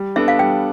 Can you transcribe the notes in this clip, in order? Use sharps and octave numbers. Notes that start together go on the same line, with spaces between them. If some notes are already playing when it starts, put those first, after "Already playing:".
Already playing: G3
B3 D4 A4 E5
F5
G3 G5